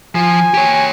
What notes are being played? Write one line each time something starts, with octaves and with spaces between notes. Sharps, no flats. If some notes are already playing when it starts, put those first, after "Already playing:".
F3 G#5
G4 C#5